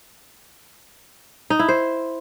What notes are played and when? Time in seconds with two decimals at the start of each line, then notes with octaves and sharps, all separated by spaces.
1.50 D#4
1.59 E4
1.69 C5